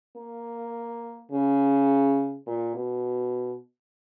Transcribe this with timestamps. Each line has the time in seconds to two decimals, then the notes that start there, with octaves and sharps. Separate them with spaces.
0.17 A#3
1.31 C#3
2.47 A#2
2.75 B2